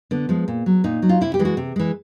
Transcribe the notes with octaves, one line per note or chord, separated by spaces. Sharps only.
D3 B3
F3 G#3
A#2
F#3
A#2 D#4
F#3
F4
C3 E4
G4
E3 G#3
F#4
C3
E3 G#3